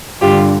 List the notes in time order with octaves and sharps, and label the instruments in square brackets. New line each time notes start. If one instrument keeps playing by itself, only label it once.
[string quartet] G2 D3 F4 G4